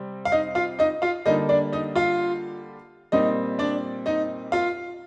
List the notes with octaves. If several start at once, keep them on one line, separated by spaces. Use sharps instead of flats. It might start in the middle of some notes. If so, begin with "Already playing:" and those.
Already playing: C3 G3 C4
F5
D#4 D#5
F4 F5
D#4 D#5
F4 F5
D3 G3 A#3 D#4 D#5
D4 D5
D#4 D#5
F4 F5
A#2 G3 C4 D#4 D#5
D4 D5
D#4 D#5
F4 F5